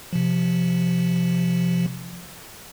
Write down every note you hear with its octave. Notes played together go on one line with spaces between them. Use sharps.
C3 F3